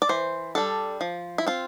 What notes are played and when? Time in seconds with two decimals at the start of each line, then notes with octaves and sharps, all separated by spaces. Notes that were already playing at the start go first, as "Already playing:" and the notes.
0.02 D5
0.09 E3 C5
0.55 G3 D4 A4
1.01 F3
1.38 E4
1.47 C4 F4